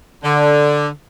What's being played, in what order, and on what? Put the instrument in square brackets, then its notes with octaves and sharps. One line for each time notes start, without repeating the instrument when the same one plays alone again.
[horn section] D3